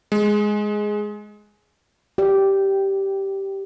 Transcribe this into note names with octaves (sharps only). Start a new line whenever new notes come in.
G#3
G4 D5